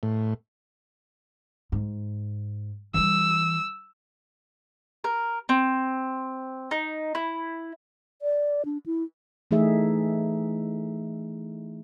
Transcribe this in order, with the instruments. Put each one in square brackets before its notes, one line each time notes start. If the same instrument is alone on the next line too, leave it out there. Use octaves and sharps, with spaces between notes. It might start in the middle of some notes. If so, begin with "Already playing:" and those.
[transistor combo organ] A2
[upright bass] G#2
[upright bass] E3 G3 [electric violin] E6
[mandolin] A#4
C4
D#4
E4
[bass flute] D5
D4
E4
[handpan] E3 A3 D#4 G#4 E5